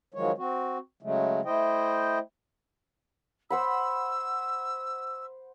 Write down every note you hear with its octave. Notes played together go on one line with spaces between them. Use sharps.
D#3 F3 F#3 G#3 C#5
C4 F#4
C#3 F#3 G#3 A3
A3 E4 C5 D#5 G5
C5 F#5 B5 E6